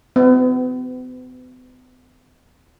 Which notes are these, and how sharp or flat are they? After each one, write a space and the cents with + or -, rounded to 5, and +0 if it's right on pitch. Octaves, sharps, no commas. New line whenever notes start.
B3 +45